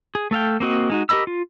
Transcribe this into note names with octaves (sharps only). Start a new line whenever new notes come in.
G#4
A3 A4 F5 G5
A#3 C4 F#4 D#5
G#3 D#4 F#4
G4 A#4 D#5 B5 E6
F4